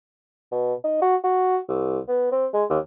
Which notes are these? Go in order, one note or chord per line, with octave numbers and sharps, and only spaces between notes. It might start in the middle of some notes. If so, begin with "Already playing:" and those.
B2
D#4
F#4
F#4
C2
B3
C4
G#3
D#2